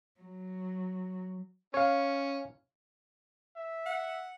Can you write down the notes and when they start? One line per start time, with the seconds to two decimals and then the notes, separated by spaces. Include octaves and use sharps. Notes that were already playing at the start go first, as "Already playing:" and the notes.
0.21 F#3
1.74 C#4 C#5 F5
3.56 E5
3.86 F#5